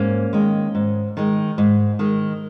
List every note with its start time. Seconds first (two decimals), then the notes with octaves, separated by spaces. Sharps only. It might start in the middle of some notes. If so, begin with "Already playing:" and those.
Already playing: G#2 A#3 C#4
0.33 D#3 G#3
0.75 G#2
1.17 D#3 G#3
1.58 G#2
1.99 D#3 G#3